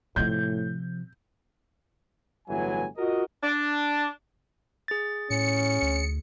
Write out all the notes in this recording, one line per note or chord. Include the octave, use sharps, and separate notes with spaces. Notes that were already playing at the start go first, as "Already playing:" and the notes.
A2 C3 F3 G6
G1 A2 E3 F#3 G#5
F4 F#4 A#4 D#5
D4
G#4 A6
A2 C#4 C#7
D2